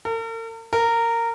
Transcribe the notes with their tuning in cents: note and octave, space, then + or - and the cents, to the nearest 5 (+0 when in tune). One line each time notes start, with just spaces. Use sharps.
A#4 -45
A#4 -15